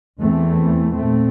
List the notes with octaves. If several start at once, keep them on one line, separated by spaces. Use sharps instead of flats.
E2 E3 A3 C4
A#2 A3 C4